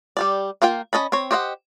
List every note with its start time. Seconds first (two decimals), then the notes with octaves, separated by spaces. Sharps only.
0.17 G3 G4 D5
0.62 A#3 F4 A#4 G5
0.93 C#4 D#5 A5 B5
1.12 C4 C#5
1.31 G4 C5 D#5 F5 F#5